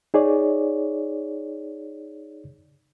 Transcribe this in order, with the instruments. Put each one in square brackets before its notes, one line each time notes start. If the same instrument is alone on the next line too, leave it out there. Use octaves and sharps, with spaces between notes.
[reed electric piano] D#4 G#4 C#5 D5